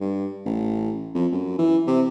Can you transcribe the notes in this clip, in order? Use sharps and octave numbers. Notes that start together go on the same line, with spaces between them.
G2
A1
F2
F#2
E3
C3